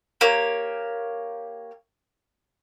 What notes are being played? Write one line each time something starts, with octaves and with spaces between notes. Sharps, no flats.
A#3 G4 C#5